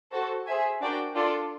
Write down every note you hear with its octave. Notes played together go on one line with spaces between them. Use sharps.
F#4 A4 C5
G#4 C5 E5 G#5
D4 F#4 A#4 D5 G5
D4 F4 A4 D5